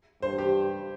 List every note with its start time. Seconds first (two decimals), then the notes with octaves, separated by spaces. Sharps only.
0.22 G2 C5
0.38 G4